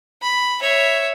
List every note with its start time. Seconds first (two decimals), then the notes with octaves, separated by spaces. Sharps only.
0.22 B5
0.61 C#5 E5